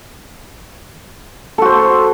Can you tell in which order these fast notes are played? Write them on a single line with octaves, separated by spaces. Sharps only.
A4 F#4 C5